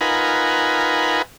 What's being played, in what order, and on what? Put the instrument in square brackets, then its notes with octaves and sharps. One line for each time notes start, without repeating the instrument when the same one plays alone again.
[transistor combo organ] D#4 F4 A#4 B4 F#5 G#5